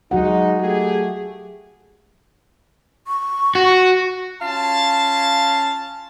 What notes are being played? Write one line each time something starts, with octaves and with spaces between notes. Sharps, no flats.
F#3 G#3 D#4 F#4 F#5
A3 G4 G#4
C#6
F#4
C#4 F4 F5 A5